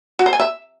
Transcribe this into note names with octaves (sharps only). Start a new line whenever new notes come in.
F#4
C5
G#5
E5